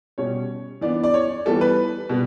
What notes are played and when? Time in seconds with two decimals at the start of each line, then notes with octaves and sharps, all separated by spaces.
0.18 B2 G3 C#4 C#5
0.81 E3 B3 D4 D5
1.04 D5
1.14 C#5
1.45 E3 G3 B3 A4
1.61 B4
2.09 B2 G3 B3